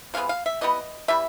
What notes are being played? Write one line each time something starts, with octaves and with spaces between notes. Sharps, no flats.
C3 E3 G#3 B3 F5
F5
E5
E3 G3 B3 D#5
E3 G3 E5